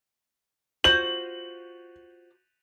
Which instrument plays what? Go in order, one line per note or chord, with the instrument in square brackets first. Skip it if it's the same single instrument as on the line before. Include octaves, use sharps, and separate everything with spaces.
[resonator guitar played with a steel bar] F4 F#4 C5 [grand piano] F#7